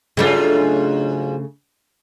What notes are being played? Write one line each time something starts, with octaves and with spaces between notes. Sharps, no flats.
G#2 C#3 F#3 A3 D4 F4